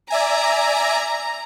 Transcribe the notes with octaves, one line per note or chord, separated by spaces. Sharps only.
D5 E5 G#5 A#5